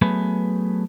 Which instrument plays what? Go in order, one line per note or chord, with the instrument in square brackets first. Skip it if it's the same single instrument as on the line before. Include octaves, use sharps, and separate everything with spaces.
[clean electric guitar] F#3 A3 B3 G#4 B4